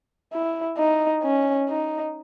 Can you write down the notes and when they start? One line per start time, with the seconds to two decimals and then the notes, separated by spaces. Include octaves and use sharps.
0.33 E4
0.78 D#4
1.23 C#4
1.69 D#4